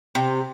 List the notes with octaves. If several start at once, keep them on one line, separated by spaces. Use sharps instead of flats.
C3